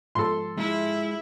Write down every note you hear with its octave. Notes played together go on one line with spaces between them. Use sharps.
G#2 F3 A4 C6
G#3 E4 F4 G#4